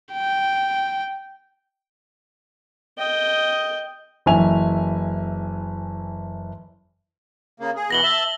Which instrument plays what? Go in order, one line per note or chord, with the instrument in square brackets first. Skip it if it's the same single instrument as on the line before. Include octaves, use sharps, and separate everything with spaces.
[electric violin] G5
[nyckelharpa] D#5 G5
[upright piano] F#1 E3 E5 G#5 F7
[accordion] C#3 A#3
G#4
[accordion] B2 E3 B3 [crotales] A#6 F#7 G7
[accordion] E5 A5